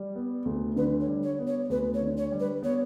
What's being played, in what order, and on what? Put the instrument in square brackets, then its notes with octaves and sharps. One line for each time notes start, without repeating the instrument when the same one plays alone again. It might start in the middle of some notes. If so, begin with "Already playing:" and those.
Already playing: [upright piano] G3
B3
D2
[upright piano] D3 [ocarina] B4
[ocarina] C#5
[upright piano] G3
[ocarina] C#5
[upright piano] B3
[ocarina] C#5
[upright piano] D2 [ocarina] B4
[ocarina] C#5
[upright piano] D3
[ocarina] C#5
[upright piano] G3
[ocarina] B4
[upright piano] B3 [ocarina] C#5